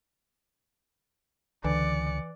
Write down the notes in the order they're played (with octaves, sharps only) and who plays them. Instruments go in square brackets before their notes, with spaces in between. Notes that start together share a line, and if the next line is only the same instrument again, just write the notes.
[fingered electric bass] C#2 [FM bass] D3 [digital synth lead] E3 [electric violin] D5 C#7